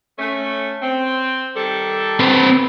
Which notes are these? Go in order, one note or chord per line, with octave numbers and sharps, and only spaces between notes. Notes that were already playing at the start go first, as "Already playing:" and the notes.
A3 C#4
C4
D#3 G3 A4
C4 B4